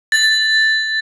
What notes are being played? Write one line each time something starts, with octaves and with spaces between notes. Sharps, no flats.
A6